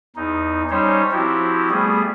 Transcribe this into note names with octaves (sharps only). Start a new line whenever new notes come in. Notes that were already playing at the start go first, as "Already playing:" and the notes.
E2 D#4
G3 C#4 D#4 C5 C#5
F3 C4 E4 F#4 G4
G3 A3 B3 G#4